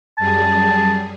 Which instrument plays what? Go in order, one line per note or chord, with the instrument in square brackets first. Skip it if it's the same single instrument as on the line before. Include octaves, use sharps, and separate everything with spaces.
[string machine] F#2 G3 G#4 [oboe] A5